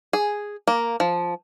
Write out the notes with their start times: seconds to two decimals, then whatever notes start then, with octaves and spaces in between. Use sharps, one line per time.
0.13 G#4
0.67 A#3
1.00 F3